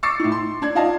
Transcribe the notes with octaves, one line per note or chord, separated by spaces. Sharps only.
C#6 D6 E6 A6 C7 C#7
A2 D#4
C6
D4 D5 G#6
D#4 F4 D5 D#5 F5 A5